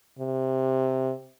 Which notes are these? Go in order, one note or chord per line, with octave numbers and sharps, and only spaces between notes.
C3